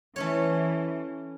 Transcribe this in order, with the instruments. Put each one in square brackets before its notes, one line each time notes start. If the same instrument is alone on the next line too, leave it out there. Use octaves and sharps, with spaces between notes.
[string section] E3 [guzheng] A3 C#4 C#5